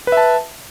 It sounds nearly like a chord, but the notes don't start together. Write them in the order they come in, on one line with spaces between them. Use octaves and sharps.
B4 E5 A5